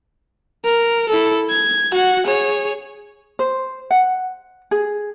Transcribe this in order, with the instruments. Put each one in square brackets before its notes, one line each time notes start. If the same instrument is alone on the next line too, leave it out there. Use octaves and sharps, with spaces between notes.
[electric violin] A#4
E4 A4
G#6
F#4 F#5
G#4 C#5
[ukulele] C5
F#5
G#4